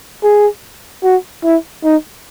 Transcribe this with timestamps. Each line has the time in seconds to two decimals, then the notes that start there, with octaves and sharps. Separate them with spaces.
0.23 G#4
1.04 F#4
1.44 E4
1.84 D#4